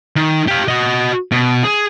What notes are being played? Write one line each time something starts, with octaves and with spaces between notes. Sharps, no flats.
D#3
G4 F5
F#4 D#5
B2
G#4